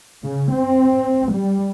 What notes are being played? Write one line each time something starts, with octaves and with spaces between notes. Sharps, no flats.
C#3
C4
G3